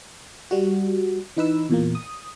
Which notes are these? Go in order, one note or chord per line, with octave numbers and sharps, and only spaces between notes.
G3 F#4
E3 D#4 B4 E6
E2 A#2 A#3
D#6